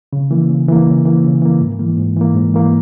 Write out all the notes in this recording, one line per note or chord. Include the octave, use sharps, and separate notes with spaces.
C#3
E3 A#3
C#3
E3 A#3
C#3
E3 A#3
C#3
E3 A#3
G#2
E3 A#3
G#2
E3 A#3
G#2
E3 A#3